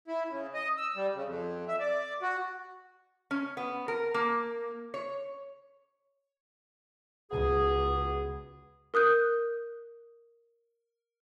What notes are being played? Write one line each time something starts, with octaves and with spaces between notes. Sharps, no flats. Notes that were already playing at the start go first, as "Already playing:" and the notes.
E4
C#3
D#5
E6
G3
C#3
F2
E5
D5
F#4
C#4
B3
A#4
A#3
C#5
C#2 B3 F#4 G#4
A#4 D#6 F#6 G6